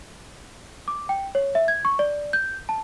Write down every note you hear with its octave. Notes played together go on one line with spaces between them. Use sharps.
D6
G5
C#5
E5
G#6
C#6
D5
G6
A5